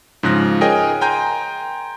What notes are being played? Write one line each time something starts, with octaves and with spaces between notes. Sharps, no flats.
G#2 C#3 F3 F#6 A#6
G#4 A#4 C#5 D#5 G5 G#5
G5 G#5 A#5 C6 G6 D#7